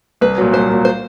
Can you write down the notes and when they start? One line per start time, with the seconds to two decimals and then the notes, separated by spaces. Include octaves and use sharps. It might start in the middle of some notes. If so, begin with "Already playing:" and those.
0.21 C2 B4
0.37 A#2 F#3
0.53 C2 C5
0.69 A#2 F#3
0.85 C5